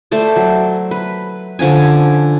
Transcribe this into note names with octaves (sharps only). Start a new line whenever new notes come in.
A3 A4 C5 D5
F#3
B4
D3 F3 C#4 G#5